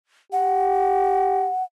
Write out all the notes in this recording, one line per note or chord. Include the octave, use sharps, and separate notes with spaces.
G4 F#5